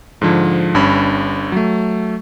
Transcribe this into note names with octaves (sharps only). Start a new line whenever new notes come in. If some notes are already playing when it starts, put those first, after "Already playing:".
G#2 D3 F3
G1 G2 C#4 B5
F#3 A3